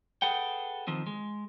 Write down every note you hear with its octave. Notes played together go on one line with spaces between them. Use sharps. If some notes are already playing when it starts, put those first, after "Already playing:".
G#4 A4 B4 F#5 G5
D#3 F3 C4
G#3